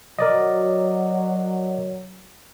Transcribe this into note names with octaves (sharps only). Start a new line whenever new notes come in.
F#3 A#4 D5 D#5